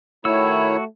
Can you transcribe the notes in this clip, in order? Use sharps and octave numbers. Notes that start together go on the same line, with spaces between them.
D#3 A3 E4 F#4 C#5 E6